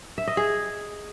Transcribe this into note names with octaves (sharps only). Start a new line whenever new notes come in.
E5
D#5
G#4